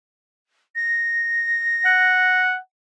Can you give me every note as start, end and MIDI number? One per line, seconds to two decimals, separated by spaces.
0.75 2.40 94
1.85 2.58 78